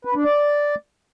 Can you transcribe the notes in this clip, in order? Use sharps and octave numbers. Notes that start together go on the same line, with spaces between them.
B4
D4
D5